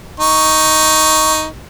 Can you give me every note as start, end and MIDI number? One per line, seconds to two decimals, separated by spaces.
0.20 1.45 63
0.20 1.45 85